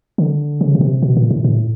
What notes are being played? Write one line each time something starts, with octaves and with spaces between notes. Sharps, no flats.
D3
C#3
B2
C3
B2
A#2
A2
A2